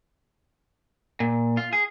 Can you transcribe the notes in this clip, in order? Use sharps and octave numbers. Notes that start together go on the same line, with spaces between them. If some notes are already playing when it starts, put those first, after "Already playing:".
A#2
F4
G#4